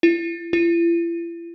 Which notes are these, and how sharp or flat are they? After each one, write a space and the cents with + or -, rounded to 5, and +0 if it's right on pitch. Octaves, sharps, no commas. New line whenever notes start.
E4 +35
E4 +45